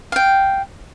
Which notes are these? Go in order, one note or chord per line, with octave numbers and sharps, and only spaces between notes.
F5 G5